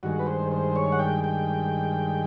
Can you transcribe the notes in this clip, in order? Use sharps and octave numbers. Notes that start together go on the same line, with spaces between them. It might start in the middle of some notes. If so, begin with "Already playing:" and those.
G2 D#3 G#3 F#4
B4
C5
C5
C#5
F#5
G5
G5